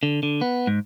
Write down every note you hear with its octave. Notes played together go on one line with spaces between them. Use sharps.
D3
D3
B3
G#2